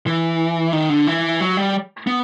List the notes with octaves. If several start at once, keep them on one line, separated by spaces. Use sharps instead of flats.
E3
D#3
D3
E3
F#3
G3
B3